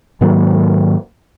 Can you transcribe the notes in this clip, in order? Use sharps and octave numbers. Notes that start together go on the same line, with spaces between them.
G#2 D#3 F#3 A#3